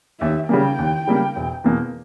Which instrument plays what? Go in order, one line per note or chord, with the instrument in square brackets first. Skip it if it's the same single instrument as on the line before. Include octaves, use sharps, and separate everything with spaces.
[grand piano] D#2 [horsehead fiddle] E5
[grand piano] C#3 G3 A#3 [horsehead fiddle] G5
[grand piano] D#2
C#3 G3 A#3
E1
E2 B2 A#3